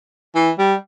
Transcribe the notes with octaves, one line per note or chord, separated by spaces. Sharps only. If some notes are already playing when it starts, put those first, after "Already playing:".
E3
G3